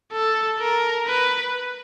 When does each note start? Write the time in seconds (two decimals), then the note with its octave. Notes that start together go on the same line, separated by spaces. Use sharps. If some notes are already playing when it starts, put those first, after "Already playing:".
0.12 A4
0.59 A#4
1.07 B4